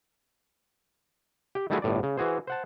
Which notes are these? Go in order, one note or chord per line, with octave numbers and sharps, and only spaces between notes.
G4 G5
D#3 G3 A3 E4 F#4 G#4
G1 A2 D5
C#3
E3 F#4 G#4 C5
C5 F#5 A5